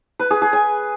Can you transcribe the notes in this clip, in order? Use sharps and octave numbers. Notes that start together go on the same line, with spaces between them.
B4
G#4
G#4
G#5